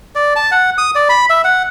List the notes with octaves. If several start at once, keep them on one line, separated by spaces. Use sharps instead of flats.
D5
A5
F#5
D#6
D5
B5
E5
F#5